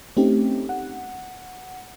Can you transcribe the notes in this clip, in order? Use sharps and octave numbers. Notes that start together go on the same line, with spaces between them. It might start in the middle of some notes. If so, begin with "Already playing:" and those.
A3 C4 C#4 D#4 G4
F#5